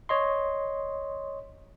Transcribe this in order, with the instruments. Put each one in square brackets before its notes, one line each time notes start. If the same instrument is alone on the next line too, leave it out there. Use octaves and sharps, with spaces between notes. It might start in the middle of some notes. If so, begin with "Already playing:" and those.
[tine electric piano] C#5 D#5 C6